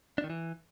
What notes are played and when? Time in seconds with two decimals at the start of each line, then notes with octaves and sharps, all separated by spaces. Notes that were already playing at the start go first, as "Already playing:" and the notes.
0.18 D4
0.24 D#3
0.30 E3